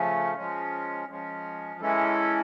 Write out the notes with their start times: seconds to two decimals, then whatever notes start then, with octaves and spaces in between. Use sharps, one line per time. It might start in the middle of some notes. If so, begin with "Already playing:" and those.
Already playing: C#3 F3 A3 C#4
0.36 F3 G#3 C#4
1.08 F3 G#3 C#4
1.80 E3 G#3 C#4 E4 A4